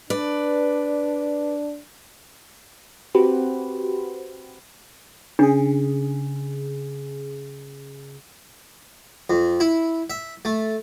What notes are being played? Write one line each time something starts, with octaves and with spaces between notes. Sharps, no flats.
D4 B4 D5
C4 F#4 G4 B4 C5
C#3 D4 G#4
F2
E4
E5
A3